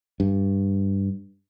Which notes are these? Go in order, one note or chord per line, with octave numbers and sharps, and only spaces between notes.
G2